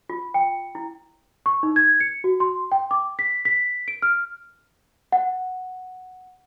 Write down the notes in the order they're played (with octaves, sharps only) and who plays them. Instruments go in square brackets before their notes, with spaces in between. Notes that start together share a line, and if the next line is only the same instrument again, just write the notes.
[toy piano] F4
G5
E4
[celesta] C#6
D#4
G#6
C#7
F#4
C6
G5
D6
B6
B6
D7
F6
F#5